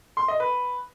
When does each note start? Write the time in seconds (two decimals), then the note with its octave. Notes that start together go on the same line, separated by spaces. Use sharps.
0.17 C6
0.28 D#5
0.40 B4